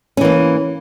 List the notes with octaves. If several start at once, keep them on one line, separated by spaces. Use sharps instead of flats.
E3 A#3 C#4